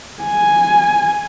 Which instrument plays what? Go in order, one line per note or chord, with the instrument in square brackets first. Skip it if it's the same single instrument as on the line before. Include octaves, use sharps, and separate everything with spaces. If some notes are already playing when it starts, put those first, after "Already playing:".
[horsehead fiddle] G#5